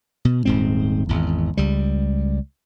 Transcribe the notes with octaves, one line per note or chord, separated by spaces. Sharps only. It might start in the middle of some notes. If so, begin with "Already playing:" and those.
B2
D#1 G#2 C4
G#1 E2
C#2 G3